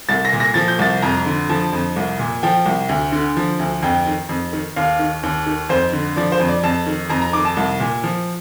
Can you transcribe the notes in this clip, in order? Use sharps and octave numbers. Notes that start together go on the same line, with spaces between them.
C2 A6
A#6
A#2
A#6
F3 A6
G6
C2 A6
F2 A#5
D3
F3 A5
F2
C2
A#2
F3 G5
C2
D2
D3
F3
D2
F2 G5
D#3
F2
D#3
D#2 F5
D#3
D#2
D#3
F2 C5
D3
F3 D5
C5
F2
D5
F2 A5
D#3
F2 A#5
A#5
D#3 D6
A5
C2
A#2
F3